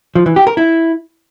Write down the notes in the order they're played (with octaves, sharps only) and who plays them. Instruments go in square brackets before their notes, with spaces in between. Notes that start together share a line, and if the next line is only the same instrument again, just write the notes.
[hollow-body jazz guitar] F3
E3
G4
A#4
E4